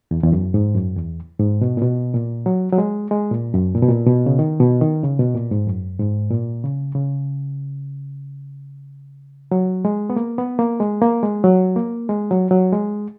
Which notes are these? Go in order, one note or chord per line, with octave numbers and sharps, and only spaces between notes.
E2
E2
F#2
G#2
F#2
E2
G#2
B2
A#2
B2
A#2
F#3
F#3
G#3
G#3
A#2
F#2
A#2
B2
A#2
B2
C#3
D#3
B2
D#3
C#3
B2
A#2
G#2
F#2
G#2
A#2
C#3
C#3
F#3
G#3
B3
A#3
B3
A#3
G#3
A#3
G#3
F#3
A#3
G#3
F#3
F#3
G#3